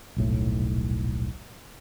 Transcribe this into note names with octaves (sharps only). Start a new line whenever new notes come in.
D#1 B1 A2